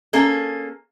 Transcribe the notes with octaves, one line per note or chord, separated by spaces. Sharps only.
A#3 C#4 G#4 A4